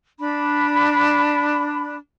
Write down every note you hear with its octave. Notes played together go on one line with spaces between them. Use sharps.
D4 B5